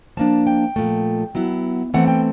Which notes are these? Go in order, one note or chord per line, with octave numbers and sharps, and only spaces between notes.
F3 A#3 D4 A5
G5
A#2 F3 A3
F#3 B3 E4
E3 A3 C4 F#5
G5